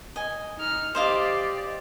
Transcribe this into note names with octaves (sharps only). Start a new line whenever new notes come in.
D#5 G#5
D#4 F6
G4 C5 D5 D#5 F5